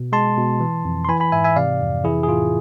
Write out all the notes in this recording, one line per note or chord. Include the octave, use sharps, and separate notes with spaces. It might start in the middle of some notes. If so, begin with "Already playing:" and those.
Already playing: B2
G#3 A5 C6
B2
E3
F2
C6
E3 G#5 B5
G#5 B5
G#2 E5 G#5
E5 G#5
C3 D5 F5
F2
E3 E4 G#4
G#4
A2 F4